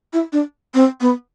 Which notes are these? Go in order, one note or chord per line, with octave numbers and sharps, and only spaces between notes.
E4
D4
C4
B3